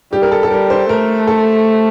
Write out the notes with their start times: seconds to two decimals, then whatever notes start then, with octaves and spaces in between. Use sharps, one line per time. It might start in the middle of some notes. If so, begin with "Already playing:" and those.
0.12 G3 G4
0.22 A#4
0.32 A4
0.43 A4
0.51 G3 A#4
0.70 C5
0.89 A3 A#4
1.27 A4